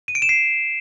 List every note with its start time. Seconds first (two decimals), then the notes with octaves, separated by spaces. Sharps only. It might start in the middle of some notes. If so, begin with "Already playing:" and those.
0.08 D#7
0.15 D7
0.22 E7
0.29 C7